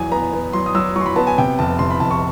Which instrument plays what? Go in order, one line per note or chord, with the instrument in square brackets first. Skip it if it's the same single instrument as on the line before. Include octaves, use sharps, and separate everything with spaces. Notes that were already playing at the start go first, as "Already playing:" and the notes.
Already playing: [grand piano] E2 F#3 G#5
B3 A#5
B3
F#3 C6
D#6
F#3 E6
F#3 C#6
C6
B5
B3 A5
G#5
C3 G5
F1 A5
C3 C6
B5
F1 A5
C#6